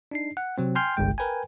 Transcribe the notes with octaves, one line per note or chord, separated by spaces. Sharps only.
D4 D#4 C7
F#5
C3 F#3 C4
G5 G#5 C6 F6 G6
G1 C2 G#3 G5
A#4 B4 G5 G#5